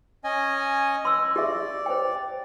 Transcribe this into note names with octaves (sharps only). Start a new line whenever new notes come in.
C#4 D#5 G#5
C6 E6
G4 D5 E5
C5 C#5 G5